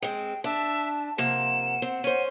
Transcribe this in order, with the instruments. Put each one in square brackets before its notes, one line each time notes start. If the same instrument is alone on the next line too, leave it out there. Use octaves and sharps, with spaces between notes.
[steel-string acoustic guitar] G#3 C4 [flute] G5
[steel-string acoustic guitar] D4 [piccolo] E5 [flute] A5
[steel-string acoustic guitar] C3 F3 A#3 [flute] F#5 [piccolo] E7
[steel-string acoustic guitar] C4
[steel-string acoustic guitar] C#4 C5 [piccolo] D#7